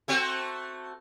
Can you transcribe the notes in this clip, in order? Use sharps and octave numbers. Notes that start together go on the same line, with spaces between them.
A3 C4 F#4